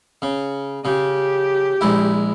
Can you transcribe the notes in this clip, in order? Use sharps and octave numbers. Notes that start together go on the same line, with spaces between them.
C#3
C#3 G4
A#1 G#3 E4